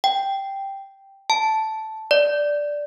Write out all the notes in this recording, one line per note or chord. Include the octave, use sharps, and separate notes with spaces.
G5
A5
D5